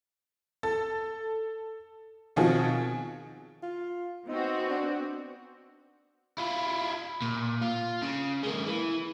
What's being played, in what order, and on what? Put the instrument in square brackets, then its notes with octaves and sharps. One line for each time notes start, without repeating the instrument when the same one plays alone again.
[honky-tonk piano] A4 A6
B2 D#3 F3 C4 F#4 G#4
[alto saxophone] F4
[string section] B3 C4 F#4 [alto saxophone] D#4
[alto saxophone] D4
[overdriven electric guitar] E4 F4
A#2
F4
C#3
G#3 A#3
E3